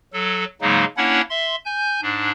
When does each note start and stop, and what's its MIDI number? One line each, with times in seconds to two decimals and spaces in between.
0.13 0.45 54
0.13 0.45 69
0.61 0.85 44
0.61 0.85 49
0.61 0.85 54
0.61 0.85 56
0.61 0.85 58
0.61 0.85 63
0.97 1.21 58
0.97 1.21 61
0.97 1.21 62
0.97 1.21 64
0.97 1.21 73
0.97 1.21 78
1.30 1.56 76
1.30 1.56 84
1.65 2.00 80
1.65 2.00 91
2.02 2.31 44
2.02 2.31 62